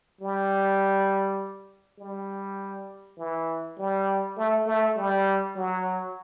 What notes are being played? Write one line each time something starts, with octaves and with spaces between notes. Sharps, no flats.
G3
G3
E3
G3
A3
A3
G3
F#3